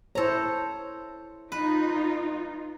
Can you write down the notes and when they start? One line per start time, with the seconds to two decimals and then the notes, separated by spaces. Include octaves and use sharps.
0.15 E4 A4 C5 C#5 A#5
1.52 D#4 F4 B4